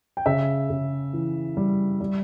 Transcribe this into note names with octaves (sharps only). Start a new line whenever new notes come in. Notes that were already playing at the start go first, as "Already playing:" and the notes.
G5
C#3 E5
C#3
E3
G3
G3